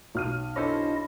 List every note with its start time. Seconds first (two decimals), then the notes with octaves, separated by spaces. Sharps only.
0.15 B1 F6 D#7
0.56 C#4 D4 E4 A4 C5 D#5